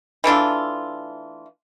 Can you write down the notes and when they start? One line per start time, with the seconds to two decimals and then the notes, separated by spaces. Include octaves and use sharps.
0.24 E3 A3 D4 F4